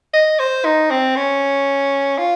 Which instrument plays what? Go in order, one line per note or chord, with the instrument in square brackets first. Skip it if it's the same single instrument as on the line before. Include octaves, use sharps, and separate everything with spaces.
[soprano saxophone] D#5
C5
D#4
C4
C#4
F4